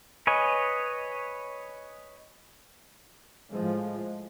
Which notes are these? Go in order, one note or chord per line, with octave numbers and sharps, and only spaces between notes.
B4 C#5 D#5 G#5
A2 F3 G#3